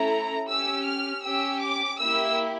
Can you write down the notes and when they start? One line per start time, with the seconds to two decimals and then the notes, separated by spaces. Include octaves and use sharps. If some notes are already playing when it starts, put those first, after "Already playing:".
Already playing: A3 C#4 E4 A4 A#5
0.48 C#4 G4 E6
0.86 F6
1.24 C#4 G4 E6
1.61 D6
1.99 A#3 E4 G4 E6